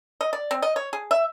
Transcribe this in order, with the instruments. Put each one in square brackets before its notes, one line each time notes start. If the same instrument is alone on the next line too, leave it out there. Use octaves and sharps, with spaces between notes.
[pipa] D#5
D5
C4
D#5
C#5
G#4
E5